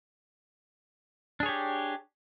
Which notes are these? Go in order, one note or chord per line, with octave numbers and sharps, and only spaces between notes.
D4 G4 G#4 C#5